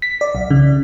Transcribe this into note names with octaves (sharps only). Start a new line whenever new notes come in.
B6
D5
B1
C#3